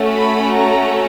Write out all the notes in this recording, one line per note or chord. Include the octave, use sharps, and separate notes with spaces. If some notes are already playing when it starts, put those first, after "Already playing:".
Already playing: A3 C#4 F#4
B5
A#5